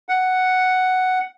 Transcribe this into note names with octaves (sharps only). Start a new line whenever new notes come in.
F#5